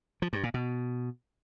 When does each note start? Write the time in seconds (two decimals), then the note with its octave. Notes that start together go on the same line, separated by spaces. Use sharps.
0.22 F3
0.33 G2
0.43 A#2
0.54 B2